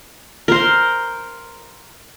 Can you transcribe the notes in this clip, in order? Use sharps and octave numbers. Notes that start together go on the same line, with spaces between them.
A#4 C5